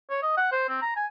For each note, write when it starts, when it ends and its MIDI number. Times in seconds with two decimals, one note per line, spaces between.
0.10 0.19 73
0.23 0.34 75
0.37 0.47 78
0.52 0.65 72
0.69 0.80 60
0.82 0.93 82
0.96 1.06 80